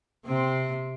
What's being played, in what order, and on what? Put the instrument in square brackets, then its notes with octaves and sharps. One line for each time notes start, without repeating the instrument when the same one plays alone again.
[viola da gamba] C3 C4